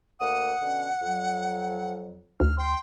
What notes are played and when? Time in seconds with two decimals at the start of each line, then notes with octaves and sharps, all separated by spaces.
0.20 D2 A#3 F#5 D#6
0.61 B2 D3 C#4
1.01 F2 F#3
2.40 D2 F6
2.58 G5 C6